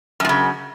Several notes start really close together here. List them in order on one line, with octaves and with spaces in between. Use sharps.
F#2 A#2 C#3